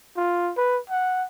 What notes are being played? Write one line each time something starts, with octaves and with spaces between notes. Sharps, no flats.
F4
B4
F#5